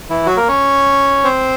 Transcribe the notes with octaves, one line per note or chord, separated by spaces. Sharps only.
E3 E4
F#3 F#4
A#3 A#4
C#4 C#5
C4 C5